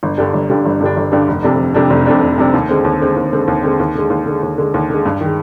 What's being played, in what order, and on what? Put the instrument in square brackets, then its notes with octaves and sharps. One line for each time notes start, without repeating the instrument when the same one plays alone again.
[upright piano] G1
G2 D3 G3 D4
G1
G2 D3 G3 D4
G1
G2 D3 G3 D4
G1
G2 D3 G3 D4
F1
F2 C3 G3 D4
F1
F2 C3 G3 D4
F1
F2 C3 G3 D4
F1
F2 C3 G3 D4
D#2
D3 G#3 C4
D#2
D3 G#3 C4
D#2
D3 G#3 C4
D#2
D3 G#3 C4
D#2
D3 G#3
D#2
D3 G#3
D#2
D3 G#3
D#2
D3 G#3
G2
D#3 G#3